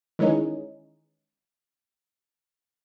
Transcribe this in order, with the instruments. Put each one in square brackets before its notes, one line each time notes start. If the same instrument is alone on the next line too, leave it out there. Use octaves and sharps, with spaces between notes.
[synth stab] D#3 E3 G#3 C#4 D#4